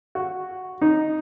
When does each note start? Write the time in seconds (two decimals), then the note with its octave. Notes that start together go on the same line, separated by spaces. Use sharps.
0.15 F#4
0.81 D#4